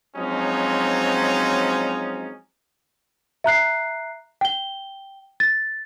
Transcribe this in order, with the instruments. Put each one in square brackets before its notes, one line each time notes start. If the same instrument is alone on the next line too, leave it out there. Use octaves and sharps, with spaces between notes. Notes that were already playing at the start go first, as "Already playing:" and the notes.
[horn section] F3 F#3 G#3 C4 C#4 D#4
[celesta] E5 A#5 F#6 C7
G5 G7
A6